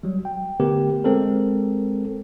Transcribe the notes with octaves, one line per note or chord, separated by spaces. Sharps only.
F#3 G3
G5
D3 A3 B3 G4 A#4
G#3 C4 A4 A#4